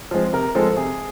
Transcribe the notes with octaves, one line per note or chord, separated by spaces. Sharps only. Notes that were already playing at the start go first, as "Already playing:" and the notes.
F3 G#3 C4
C3 A#4
F3 G#3 C4 A4
C3 G#4